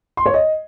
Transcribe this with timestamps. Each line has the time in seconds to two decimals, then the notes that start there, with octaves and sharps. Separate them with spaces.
0.17 C6
0.26 C#5
0.34 D#5